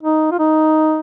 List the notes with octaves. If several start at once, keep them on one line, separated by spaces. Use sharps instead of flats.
D#4
F4
D#4